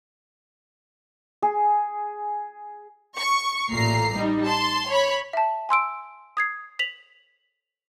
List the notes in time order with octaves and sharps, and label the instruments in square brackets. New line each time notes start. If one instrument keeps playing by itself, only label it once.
[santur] G#4
[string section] C#6
A1 A#2 A3 A#5 C7
G3 D#4
A5 C6
C#5 B5
[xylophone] E5 A5
G#5 C6 E6 D7
D#6 G#6 C7
B6 F7 F#7